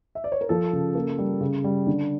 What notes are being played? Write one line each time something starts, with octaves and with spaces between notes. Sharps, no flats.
E5
D5
C#5
A#4
F3 A4
C#3
A#3
G3
C#3
G3
D3